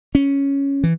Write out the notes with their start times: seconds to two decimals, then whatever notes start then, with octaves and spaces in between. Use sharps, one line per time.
0.15 C#4
0.84 E3